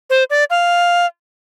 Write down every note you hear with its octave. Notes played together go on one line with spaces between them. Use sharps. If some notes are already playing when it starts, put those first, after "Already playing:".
C5
D5
F5